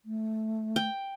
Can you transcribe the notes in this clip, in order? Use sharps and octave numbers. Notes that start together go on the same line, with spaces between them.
A3
G5